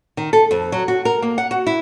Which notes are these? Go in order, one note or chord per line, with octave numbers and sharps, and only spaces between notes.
D#3
A4
F2
F#3
F#4
A#4
A#3
F#5
F#4
E4